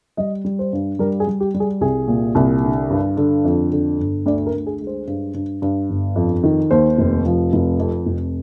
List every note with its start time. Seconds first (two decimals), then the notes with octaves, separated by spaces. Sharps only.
0.17 G3 D#5
0.45 G3
0.59 C5
0.73 G2
0.99 G3 A#4
1.20 G#4
1.27 G3
1.40 G4
1.54 G3
1.60 G#4
1.81 C2 G#4
2.08 A#2
2.35 C2
2.63 D3
2.90 G2
3.17 D3
3.45 F2
3.72 D3
3.99 G1
4.26 D2 D5
4.47 A#4
4.53 D2
4.67 G#4
4.81 G#3
4.87 C5
5.07 G2
5.34 G2
5.62 G2
5.90 G1
6.16 F2
6.43 D#3
6.71 D#2 C5
6.98 F1
7.26 F3
7.53 F1
7.80 F2
8.06 F1